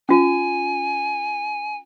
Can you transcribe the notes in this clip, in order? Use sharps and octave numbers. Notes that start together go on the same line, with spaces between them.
C#4 F4 G#5